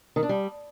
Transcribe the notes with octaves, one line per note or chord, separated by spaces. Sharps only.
D#3
D4
G3